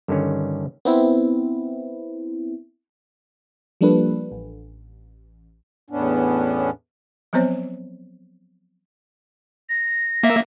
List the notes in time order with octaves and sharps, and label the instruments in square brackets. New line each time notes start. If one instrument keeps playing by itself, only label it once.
[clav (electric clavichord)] G2 D3 D#3 C#4
[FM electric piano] B3 C4 E4
F3 G3 A#3 D4 A4 B4
A1
[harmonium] E2 A2 B3 C#4 D4
[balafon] F3 F#3 B3 C4 C5 C#5
[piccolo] A#6
[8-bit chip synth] A#3 E5